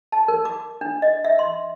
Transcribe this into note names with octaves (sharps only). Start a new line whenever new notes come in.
A5
A#4
D6
D4
D#5
E5
C6